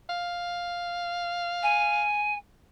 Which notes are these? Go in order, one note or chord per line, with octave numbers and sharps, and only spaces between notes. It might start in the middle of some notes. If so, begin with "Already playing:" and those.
F5
G#5